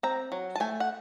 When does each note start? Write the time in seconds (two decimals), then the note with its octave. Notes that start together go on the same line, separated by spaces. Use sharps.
0.03 C4 A#5
0.32 F#3
0.56 A5
0.60 A3 G#5
0.80 F#5